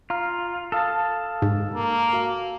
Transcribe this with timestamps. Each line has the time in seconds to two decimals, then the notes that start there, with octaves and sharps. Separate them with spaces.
0.10 F4 F5 A#5 F6
0.72 A4 F5 A5 D#6 F6
1.42 G#2
1.75 A#3
2.13 F#4 F5